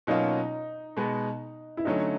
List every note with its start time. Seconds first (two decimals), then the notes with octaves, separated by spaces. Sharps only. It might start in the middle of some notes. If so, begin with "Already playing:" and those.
0.07 B2 F#3 A#3 C#4 D#4 F4
0.97 B2 G#3 B3
1.77 E4
1.85 D3 F#3 A3 C#4 D#4